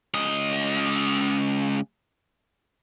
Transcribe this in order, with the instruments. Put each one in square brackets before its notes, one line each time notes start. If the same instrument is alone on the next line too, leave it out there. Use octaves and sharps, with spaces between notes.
[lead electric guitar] C#2 D#5